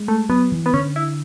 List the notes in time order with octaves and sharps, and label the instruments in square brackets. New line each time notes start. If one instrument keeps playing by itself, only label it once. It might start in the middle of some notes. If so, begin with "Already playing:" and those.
Already playing: [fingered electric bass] G#3
[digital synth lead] A3
[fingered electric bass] F#3 [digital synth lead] B3
[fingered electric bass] E3
[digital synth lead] B3
[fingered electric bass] D3 [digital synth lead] C#4
[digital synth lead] E4